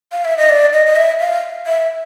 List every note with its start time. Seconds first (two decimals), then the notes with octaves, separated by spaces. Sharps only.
0.12 F5
0.25 E5
0.37 D#5
0.49 D5
0.73 D#5
0.87 D#5
0.96 E5
1.20 F5
1.66 E5